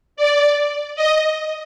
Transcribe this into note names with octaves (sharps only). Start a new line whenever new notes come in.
D5
D#5